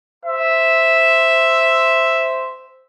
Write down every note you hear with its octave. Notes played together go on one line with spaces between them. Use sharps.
C5 E5